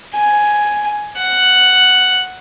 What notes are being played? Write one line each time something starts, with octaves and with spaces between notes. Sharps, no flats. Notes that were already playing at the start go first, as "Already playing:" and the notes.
G#5
F#5